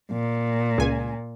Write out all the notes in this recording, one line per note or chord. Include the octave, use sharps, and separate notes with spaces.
A#2
C#2 G#5